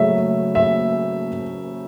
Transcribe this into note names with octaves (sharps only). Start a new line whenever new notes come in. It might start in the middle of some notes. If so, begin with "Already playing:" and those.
Already playing: C#3 F#3 A3 E5
E5